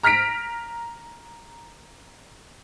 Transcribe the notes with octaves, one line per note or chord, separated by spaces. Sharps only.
A#5 F6 A#6 B6 D7